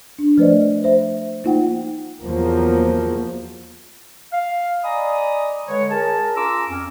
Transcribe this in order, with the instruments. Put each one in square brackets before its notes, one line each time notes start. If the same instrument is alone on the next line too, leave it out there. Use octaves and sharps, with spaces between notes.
[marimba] D4
F3 A3 B4 C5 D5 D#5
C5 E5
A#3 D#4 F4 C5 F#5 G5
[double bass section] E2 F3 F#3 A#3
[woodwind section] F5
D5 D#5 G#5 A#5 B5 D#6
D3 G#3 B4 C#5
G#4 A#4 A5
C#4 F4 A#5 D6 E6
F2 C#4